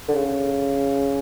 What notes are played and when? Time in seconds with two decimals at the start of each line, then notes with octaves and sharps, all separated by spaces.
0.08 D3
0.15 C#3